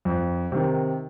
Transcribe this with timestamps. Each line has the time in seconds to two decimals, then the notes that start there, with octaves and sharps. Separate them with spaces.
0.05 F2
0.52 C3 D#3